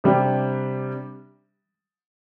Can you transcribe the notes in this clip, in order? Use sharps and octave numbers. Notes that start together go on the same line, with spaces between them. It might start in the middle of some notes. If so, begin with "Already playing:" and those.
C3 G3 D4 G4